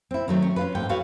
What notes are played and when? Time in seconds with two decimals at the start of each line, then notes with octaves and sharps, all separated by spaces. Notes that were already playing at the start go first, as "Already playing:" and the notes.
0.11 C4 E4
0.28 D#3 F#3 A3 C4
0.42 C#4
0.56 C#4 F4 B4
0.75 G#2 A#3 A4 G5
0.89 E4 F#4 A4 B4 C#5 F5